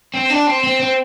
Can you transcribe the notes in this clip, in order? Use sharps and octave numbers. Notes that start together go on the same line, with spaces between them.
C4
D4
C4
C4
C4